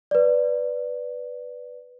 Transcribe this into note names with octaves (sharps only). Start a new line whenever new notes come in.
B4 D5